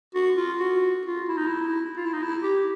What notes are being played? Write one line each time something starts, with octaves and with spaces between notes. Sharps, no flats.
F#4
F4
F#4
F4
E4
D#4
E4
F4
E4
D#4
E4
G4